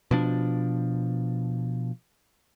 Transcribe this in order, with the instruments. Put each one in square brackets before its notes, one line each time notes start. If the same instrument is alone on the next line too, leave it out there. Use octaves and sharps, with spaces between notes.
[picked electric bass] B2 F3 D4